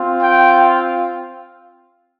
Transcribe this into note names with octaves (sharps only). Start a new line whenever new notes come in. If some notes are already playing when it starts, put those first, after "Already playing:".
Already playing: C4 F4
G5